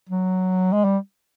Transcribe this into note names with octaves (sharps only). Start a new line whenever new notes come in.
F#3
G#3
G3